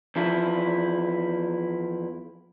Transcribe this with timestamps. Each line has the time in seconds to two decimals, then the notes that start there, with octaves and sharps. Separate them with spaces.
0.16 E2 F3 E4